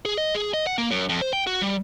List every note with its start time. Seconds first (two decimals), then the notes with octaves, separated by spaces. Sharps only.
0.05 G#4
0.18 D#5
0.35 G#4
0.54 D#5
0.67 F#5
0.78 A#3
0.91 F#2
1.09 F2
1.22 C5
1.33 G5
1.47 F#4
1.62 G3